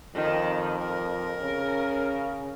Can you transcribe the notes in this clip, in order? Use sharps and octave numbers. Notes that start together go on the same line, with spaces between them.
F2 D#3
A#4
C#3